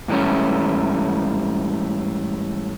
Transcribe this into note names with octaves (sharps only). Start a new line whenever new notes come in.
G#2 E3 G3 A3 C#4